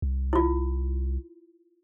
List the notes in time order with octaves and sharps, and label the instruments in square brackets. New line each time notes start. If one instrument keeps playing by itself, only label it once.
[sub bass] C2
[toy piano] E4 F4